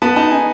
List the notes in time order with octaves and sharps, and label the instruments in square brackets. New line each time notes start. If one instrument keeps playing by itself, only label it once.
[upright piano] B3 A5
D#4 A5
D#4 G#5